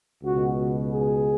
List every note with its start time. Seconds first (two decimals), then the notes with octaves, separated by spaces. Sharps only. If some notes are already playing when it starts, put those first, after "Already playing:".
0.23 C#2 B2 F#4
0.89 G#4